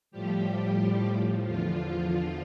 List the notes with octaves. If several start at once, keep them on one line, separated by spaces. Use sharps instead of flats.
A2 F3 G3 G4
E2 D3 F3 F4